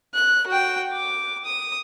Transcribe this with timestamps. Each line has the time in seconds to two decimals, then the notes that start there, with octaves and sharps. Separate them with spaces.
0.14 F#6
0.47 F#4 G5
0.92 D6
1.45 D#6